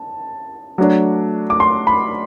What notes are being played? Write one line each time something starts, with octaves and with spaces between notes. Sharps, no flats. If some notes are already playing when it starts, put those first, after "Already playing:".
Already playing: A5
F#3 A3 D4
D6
C6
B5